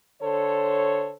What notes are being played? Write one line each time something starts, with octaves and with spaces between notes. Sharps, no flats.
D3 A4 C5 C#5